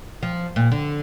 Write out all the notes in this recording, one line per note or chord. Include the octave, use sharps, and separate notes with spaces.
F3
A#2
D3